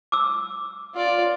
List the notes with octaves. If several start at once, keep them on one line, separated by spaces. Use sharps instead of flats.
D6 E6
F4 D5